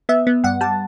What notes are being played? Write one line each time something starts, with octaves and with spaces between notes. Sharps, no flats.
B3 E5
B3
G2 F#5
G3 A5